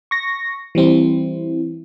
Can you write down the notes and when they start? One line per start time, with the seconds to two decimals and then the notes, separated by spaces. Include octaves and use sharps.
0.11 C#6 A#6
0.75 E3 G3 C4 E4